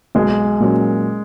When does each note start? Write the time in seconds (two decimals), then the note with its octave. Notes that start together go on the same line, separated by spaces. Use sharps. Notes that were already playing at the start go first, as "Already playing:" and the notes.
0.15 B1 G#3
0.60 A#2 F#3 C#4